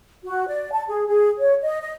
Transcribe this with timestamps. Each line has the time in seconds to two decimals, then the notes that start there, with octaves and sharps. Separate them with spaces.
0.25 F#4
0.47 D5
0.73 A5
0.89 G#4
1.07 G#4
1.38 C#5
1.62 D#5
1.81 D#5